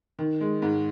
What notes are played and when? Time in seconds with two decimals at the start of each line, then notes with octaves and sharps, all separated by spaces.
0.19 D#3
0.41 G#3
0.62 G#2